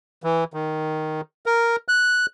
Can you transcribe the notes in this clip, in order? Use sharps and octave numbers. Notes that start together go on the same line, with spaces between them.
E3
D#3
A#4
F#6